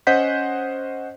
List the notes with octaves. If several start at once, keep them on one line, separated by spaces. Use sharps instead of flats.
C#4 C5 D#5 F#5 G6 B6